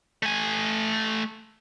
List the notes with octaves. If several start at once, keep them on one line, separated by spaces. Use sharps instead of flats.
A3 G#5